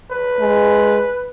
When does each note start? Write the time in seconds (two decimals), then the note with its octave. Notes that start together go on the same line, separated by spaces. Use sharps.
0.11 B4
0.40 G#3